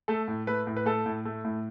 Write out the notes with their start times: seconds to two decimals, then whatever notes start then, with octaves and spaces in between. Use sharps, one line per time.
0.08 A3 A4
0.28 A2
0.47 A3 B4
0.67 A2
0.76 B4
0.86 A3 A4
1.06 A2
1.25 A3
1.45 A2